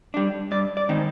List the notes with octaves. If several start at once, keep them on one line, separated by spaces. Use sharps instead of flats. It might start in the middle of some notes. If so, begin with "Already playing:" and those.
G3 D4
G2 D5
D5
D#3 G#3 C4 D#4